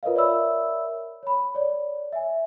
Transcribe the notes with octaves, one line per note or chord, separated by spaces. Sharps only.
F4 A#4 B4 C#5 D#5 F5
A#4 C#5 D5 E5 B5 E6
C#5 B5
C#5 D5
E5 G#5